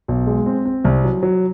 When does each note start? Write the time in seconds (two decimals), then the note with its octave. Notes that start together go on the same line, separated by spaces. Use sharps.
0.08 B1
0.27 G#3
0.46 C4
0.65 C4
0.85 C2
1.04 F#3
1.23 F#3